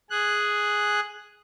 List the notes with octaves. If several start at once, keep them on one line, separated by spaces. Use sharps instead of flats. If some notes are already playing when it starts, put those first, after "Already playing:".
G#4 F#6